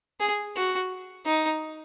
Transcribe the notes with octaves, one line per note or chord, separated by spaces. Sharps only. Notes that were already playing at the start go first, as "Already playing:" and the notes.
G#4
F#4
D#4